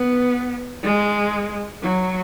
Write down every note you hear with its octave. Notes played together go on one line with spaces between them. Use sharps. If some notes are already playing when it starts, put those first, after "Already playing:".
Already playing: B3
G#3
F#3